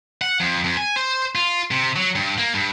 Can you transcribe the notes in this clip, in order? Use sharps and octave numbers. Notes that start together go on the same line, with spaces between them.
F#5
F2
F2
G#5
C5
F4
C3
F#3
G2
A#3
G2